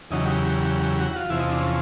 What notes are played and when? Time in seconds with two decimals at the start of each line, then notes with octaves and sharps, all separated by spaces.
0.11 E2 C#3 F#3 D#4
0.25 G4
1.01 F#4
1.16 F4
1.30 E2 C3 F3 E4
1.40 D#4
1.50 D4
1.60 C#4